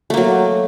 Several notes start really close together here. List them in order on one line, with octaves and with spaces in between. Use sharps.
A3 A#3 F#3